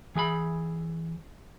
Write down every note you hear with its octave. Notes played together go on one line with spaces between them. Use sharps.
E3 G#4 G#5 B5